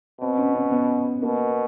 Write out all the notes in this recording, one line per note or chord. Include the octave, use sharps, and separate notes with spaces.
B2 C4
C#4
C#4
B3
B2 A#3